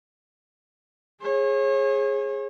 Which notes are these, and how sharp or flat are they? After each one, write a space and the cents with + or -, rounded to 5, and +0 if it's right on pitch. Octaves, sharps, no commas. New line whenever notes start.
G#4 +0 C#5 -35